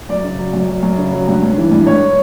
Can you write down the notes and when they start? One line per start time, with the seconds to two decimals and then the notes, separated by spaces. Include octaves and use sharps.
0.09 F#2 D5
0.24 C#3
0.39 F#3
0.53 F#2
0.68 F#2
0.83 F#2
0.98 C#3
1.13 F#3
1.28 G2
1.42 G2
1.58 E3
1.72 G2
1.86 G2 C#5